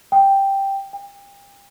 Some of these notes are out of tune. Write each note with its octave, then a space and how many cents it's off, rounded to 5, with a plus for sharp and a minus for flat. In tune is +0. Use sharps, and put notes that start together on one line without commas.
G5 +0
G5 +35